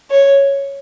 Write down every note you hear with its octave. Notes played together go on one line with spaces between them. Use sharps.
C#5